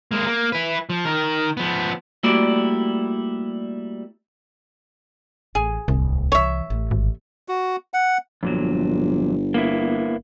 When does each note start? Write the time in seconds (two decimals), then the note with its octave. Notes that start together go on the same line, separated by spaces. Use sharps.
0.11 G#3 A#3
0.27 A#3
0.52 E4 B4
0.90 F3
1.05 D#3 A#4
1.57 F3 B3
2.23 G3 A3 A#3 E4 F#4 D5
5.55 A1 G#4
5.88 D1 C2
6.32 E3 E4 C#5 E5
6.70 A1
6.91 G#1
7.48 F#4
7.94 F#5
8.43 G1 F2 A#2 F#3
9.54 A#3 B3 E4